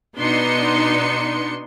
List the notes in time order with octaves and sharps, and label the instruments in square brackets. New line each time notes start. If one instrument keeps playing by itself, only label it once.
[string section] B2 B3 D4 D#4 C6 C#7